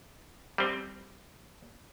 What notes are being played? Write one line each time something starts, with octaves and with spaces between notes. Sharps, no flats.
G3 C4